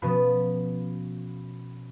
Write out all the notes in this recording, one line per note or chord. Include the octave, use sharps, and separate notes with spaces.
B2 F3 B3 C#4 F#4 B4